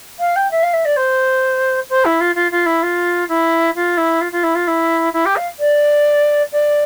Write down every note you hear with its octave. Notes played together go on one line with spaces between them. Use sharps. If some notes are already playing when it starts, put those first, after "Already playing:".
F5
G5
E5
F5
E5
D5
C5
C5
E4
F4
F4
F4
E4
F4
E4
F4
E4
F4
F4
E4
F4
E4
E4
G4
F5
D5
D5